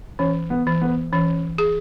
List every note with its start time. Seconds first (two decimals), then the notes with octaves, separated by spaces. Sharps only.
0.19 E3 C#4
0.50 B3
0.67 E3
0.81 B3
1.12 E3 C#4
1.58 G#4